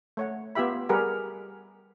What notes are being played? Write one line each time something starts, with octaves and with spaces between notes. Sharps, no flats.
A3 C#5 F#5
B3 F4 G4 E5 B5
G3 G4 G#4 A#4 B4 F#5